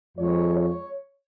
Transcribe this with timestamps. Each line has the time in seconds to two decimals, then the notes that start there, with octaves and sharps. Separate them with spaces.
0.16 F2 F3 G#3 C#5
0.53 C#5